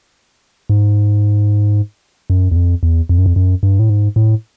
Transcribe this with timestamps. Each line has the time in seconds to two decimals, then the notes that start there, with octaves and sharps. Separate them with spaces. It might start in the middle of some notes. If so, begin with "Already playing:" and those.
0.69 G#2
2.30 F#2
2.51 E2
2.56 F2
2.83 E2
3.09 F2
3.18 F#2
3.26 F2
3.36 F#2
3.63 G2
3.79 A2
3.90 G#2
4.16 A2